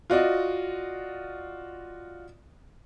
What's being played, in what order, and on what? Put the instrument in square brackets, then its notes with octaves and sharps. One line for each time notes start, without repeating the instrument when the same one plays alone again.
[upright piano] F4 F#4 D5 D#5